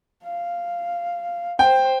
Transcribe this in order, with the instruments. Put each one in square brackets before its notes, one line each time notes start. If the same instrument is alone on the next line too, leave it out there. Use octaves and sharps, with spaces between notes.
[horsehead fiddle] F5
[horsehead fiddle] C5 [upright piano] G5